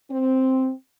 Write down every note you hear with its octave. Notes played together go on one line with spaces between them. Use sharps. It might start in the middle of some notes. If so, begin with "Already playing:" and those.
C4